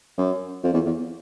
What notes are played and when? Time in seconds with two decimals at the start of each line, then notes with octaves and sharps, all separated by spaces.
0.18 F#2
0.63 F2
0.74 E2
0.85 E2